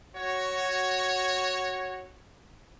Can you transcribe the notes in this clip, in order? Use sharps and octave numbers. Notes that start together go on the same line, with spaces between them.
F#4 C#5